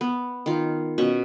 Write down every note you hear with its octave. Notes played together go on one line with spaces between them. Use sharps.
B3
D#3 F4
B2 C#4 C#6